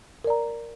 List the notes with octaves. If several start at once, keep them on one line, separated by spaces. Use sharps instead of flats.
A#4 D5 A#5